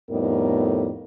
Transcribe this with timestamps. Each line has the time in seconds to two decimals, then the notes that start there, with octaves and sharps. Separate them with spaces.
0.10 F2 A2 G3 B3 D#4 A#4